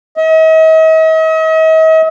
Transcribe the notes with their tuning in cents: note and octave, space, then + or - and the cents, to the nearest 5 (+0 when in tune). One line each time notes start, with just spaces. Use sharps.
D#5 +45